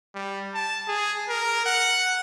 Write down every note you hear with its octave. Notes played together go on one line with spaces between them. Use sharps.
G3
A5
G#4
A#4
F#5